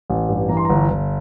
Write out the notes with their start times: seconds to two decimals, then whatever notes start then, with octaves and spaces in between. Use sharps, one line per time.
0.10 A1
0.29 G2
0.49 E3 A#5
0.57 C6
0.65 G1 A#5
0.90 G1